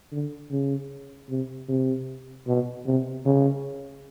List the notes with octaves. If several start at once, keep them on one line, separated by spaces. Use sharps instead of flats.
D3
C#3
C3
C3
B2
C3
C#3